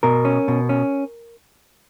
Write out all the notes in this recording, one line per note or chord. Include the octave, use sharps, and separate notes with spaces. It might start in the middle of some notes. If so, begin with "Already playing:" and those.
B2 A#4
C#4
B2
C#4